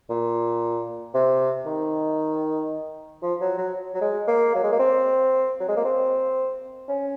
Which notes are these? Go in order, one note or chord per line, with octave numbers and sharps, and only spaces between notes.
A#2
C3
D#3
F3
F#3
F#3
F#3
G#3
A#3
F#3
G#3
A#3
C4
F#3
G#3
A#3
C4
C#4